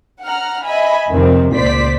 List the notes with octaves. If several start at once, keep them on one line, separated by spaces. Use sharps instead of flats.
F#5 A#5 F6
D#5 E5 G#5 B5
F2 C3 D#3 C4
C#2 A#2 C5 D5 B6